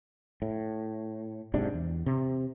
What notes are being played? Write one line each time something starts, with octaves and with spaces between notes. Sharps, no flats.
A2
F#1 G#2 C3 D4
E2
C3